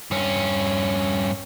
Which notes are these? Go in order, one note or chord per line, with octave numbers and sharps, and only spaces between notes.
G2 C#4